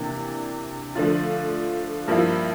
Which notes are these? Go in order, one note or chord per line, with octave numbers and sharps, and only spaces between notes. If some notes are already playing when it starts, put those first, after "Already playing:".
Already playing: C3 E3 A#3 D4
D3 F3 A3 D4 F4
G2 F3 A#3 E4